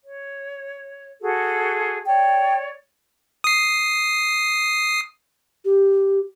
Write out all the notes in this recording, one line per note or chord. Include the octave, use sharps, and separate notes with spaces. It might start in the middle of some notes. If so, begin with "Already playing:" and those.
C#5
F#4 G#4 A4
C#5 D5 G5
D#6 C7
G4